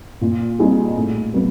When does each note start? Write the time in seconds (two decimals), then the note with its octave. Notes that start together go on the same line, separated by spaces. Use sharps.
0.21 A#2
0.59 G3 C4 D#4 G#4
0.96 A2
1.34 F#3 B3